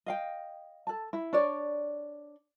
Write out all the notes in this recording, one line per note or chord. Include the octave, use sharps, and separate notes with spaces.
D#5 F5 G5
A4 A5
E4
D4 C#5 D5